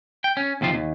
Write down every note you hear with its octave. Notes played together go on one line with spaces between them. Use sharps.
G5
C#4
D#2 C3 F3 F4
D#2